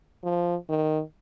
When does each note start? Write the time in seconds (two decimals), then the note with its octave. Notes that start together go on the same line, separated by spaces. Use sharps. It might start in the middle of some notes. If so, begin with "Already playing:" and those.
0.24 F3
0.69 D#3